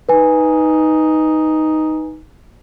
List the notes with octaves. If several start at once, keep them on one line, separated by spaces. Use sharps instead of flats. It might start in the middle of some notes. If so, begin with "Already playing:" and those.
D#4 B4 G#5